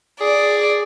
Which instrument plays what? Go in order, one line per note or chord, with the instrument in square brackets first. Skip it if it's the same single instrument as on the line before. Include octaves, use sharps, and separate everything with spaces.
[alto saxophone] G#4 [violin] D5